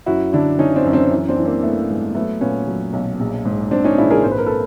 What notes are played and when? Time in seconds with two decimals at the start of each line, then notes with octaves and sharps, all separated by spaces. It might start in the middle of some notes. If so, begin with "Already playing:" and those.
0.06 F#2 E4 F#4
0.33 D3 D4 E4
0.59 D3 C#4 D#4
0.76 C4 D4
0.85 F#2
0.93 C4 D4
1.11 E3
1.28 C4 D4
1.37 E3
1.45 A#3 C4
1.63 E3 A3 B3
1.90 G#2
2.15 F#3 A3 B3
2.41 A#2 B3 C#4
2.67 F#3
2.93 B1
3.20 A#1
3.45 G#2
3.71 G#2 C4 D4
3.84 C#4 D#4
3.98 A#1 D4 E4
4.10 G#4 A#4
4.24 G#1 C5
4.31 B4
4.38 A#4
4.46 A4 B4